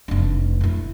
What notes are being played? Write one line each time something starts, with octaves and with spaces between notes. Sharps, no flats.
F1 D4
D3 E4